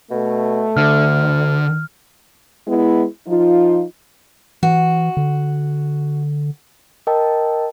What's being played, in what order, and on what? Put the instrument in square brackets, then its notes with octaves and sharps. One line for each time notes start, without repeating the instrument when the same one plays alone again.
[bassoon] B2 [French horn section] A3
[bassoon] D2 [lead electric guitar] D3 [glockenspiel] F6
[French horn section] G#3 B3 E4
F3 D#4 F4
[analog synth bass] E3 [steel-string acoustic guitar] F#4
[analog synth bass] D3
[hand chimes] A#4 D#5 G5 A5